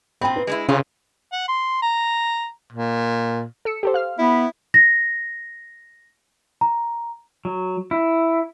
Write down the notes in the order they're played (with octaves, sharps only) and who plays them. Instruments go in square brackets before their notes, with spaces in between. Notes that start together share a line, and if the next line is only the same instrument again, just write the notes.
[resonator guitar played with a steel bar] A#2 C4 [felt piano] G5 B5
[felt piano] B4
[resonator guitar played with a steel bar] G#3 D4 E4
[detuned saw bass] C#3 [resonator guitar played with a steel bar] F4
[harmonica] F#5
C6
A#5
[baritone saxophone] A#2
[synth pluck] A4 E6 C#7
G4 A4 C5
F5 F6
[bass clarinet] B3 [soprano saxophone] E4
[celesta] A#6
A#5
[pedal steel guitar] F#3
E4